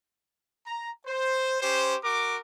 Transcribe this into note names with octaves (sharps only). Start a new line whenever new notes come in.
A#5
C5
C#4 G4 C5
F#4 A#4 D6